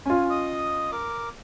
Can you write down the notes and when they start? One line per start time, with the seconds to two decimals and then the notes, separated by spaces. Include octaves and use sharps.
0.06 C#4 F4 G#5
0.30 D#5 D#6
0.92 A#4 D6